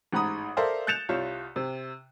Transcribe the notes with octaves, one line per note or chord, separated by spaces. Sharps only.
A1 G#2 F#5 A#5 B5 D#6
A4 A#4 C5 D5 E5 F5
F#6 G6 A6 C#7 E7 F7
C2 F4 C#5
C3